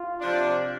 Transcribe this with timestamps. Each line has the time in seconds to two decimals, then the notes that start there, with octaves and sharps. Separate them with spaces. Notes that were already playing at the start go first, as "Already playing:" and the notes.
Already playing: F4
0.20 C3 F3 D4